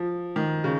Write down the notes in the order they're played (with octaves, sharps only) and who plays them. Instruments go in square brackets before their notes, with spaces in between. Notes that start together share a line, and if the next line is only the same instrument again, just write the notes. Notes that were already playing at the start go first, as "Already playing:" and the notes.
Already playing: [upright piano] F3
D#3
C#3